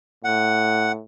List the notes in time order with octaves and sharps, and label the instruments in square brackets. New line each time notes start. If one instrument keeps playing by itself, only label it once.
[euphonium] A2 [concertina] F#5